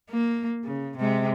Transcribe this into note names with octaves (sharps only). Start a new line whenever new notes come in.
A#3
C#3
C3 G#3